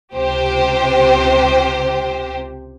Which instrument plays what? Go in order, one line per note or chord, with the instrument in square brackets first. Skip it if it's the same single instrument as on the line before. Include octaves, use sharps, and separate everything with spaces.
[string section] C#2 C3 G4 C5